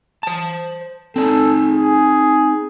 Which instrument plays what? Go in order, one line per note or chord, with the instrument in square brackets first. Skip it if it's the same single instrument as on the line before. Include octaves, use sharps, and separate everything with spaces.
[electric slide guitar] C5 A5
[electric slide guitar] C4 D#4 [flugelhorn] A4
[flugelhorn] G#4